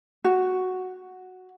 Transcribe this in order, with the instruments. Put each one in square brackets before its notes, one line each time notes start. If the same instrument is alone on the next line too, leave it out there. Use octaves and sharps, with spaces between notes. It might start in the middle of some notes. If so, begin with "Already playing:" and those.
[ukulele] F#4